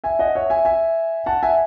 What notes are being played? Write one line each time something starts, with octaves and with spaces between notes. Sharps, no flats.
E5 G#5
D#5 F#5
C#5 E5
E5 G#5
E5 G#5
F#5 A5
E5 G#5